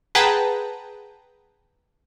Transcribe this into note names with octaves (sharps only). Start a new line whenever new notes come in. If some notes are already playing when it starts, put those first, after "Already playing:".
G#4 B4 F#5 G5 A5 A#5